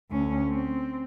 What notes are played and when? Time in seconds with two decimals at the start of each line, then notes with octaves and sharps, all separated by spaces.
0.11 D2 C#4
0.50 C4